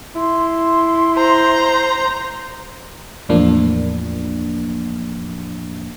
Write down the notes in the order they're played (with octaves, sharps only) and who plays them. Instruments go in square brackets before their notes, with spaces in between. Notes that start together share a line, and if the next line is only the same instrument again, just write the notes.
[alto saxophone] E4 [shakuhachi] C6
[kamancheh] C5 A#5
[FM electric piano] E2 A2 F3 A#3 D4